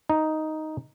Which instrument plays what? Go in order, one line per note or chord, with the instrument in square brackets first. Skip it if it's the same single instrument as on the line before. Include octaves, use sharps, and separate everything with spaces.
[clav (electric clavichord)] D#4